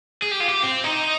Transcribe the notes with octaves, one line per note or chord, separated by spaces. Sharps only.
G#4
G4
F4
G4
C4
D#4